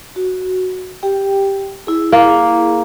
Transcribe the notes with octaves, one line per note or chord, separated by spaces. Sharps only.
F#4
G4 G5
E4 G#4
A#3 E4 G#4